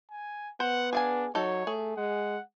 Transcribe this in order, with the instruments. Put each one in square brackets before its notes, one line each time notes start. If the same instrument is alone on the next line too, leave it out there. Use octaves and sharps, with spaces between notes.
[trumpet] G#5
[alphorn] B3 [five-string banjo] C5 [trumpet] F#5
[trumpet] D4 [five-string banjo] G#4 F5 G#5
[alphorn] F#3 [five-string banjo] D#4 A4 [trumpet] C#5
[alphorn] A3 [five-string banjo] G#4
[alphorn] G#3 [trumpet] F#5